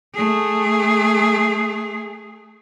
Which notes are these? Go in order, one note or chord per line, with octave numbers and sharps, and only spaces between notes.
A3 G#4